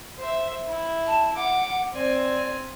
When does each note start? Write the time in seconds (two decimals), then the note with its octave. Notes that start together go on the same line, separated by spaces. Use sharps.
0.18 C5 E5
0.68 E4
1.07 A5
1.36 F#5 D6
1.94 C4 D5 G#5